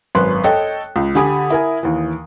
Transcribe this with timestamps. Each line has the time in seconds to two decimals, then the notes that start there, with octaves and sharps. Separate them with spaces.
0.15 G#1 F#2 B4 C6 F#6
0.44 A4 C#5 D#5 G5
0.96 C#2
1.15 D3 G4 G#5 B5 D#6
1.50 E4 A#4 G#5
1.83 D#2 E3